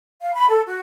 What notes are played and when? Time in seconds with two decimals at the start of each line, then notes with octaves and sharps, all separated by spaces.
0.22 F5
0.34 B5
0.49 A4
0.67 F#4